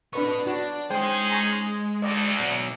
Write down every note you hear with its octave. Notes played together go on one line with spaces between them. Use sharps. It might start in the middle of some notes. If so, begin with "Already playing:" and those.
B3 D4 B4 D#5 C#6
D4 F#4
G#3 C#4 D#4 G#4 C5 G5 C6
A#5 C#6
D2 D5 D#5
B1